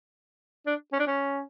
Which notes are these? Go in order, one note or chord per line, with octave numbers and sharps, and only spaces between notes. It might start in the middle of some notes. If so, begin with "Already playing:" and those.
D4
C#4
D4
C#4